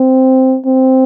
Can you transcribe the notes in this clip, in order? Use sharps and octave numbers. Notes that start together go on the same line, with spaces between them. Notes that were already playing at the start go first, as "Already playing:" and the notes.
Already playing: C4
C4